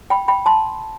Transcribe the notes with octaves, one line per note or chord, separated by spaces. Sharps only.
G5 B5
G5 B5
A5 C6